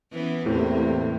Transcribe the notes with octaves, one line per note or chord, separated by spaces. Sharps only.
E3 B3 C#4
E2 A2 C3 A#3